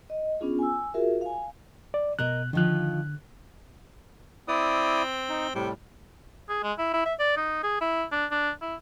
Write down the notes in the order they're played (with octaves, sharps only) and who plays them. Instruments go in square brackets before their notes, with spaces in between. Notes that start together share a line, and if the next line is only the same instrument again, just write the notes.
[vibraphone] D#5
B3 C#4 D4 F4 G#4
G#5 E6
F4 F#4 G#4 A#4 E5
F5 G#5
[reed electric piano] D5
[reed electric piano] B2 F#6 [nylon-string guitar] A#4 D#5
[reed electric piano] D3 F#6 [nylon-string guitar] D#3 F3 F4
[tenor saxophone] C4 [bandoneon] E4 D5 D#6
[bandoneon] D#4
[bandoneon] A2 G3 [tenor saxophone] C3
[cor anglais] G#4
G#3
E4
E4
E5
D5
D#4
G#4
E4
D4
D4
E4